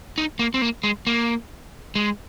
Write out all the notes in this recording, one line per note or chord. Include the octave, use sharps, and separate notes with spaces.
D#4
A#3
C4
A#3
G#3
A#3
G#3